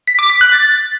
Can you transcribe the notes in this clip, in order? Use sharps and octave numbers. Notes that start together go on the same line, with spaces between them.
B6
D6
B6
F#6
A6